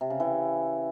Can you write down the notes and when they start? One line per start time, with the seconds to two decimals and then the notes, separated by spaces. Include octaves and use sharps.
0.01 C3
0.10 C#3
0.20 E3